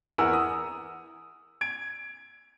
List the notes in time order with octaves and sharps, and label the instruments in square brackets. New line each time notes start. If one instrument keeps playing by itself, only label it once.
[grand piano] E2 E4 A#4 F#5 G#5 E6
D#6
G#6 D7